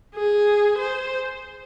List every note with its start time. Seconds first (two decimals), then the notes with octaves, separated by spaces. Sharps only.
0.15 G#4
0.79 C5